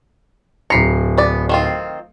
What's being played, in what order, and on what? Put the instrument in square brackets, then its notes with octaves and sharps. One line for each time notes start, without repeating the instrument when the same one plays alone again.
[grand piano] D1 C7 C#7 [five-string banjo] A#5 B5
[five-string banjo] B3 D5
D#3 C4 F4